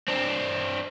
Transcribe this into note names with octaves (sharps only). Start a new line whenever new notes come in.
C4 D4